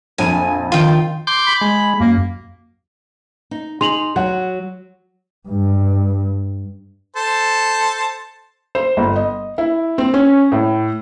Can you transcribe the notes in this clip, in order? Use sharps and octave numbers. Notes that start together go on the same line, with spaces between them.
A#1 F2 G#5 D#7
D#3 F4 G5
C6 D6 G6
B5
G#3
F#2 A#3
D#4
D#4 G#4 C6 F7 F#7
F#3 F#5
G2
A4 C5 A5
C5
G1
D#5
E4
C4
C#4
A2